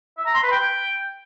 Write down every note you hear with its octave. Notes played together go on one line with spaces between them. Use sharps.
E5
A#5
C6
B4
G5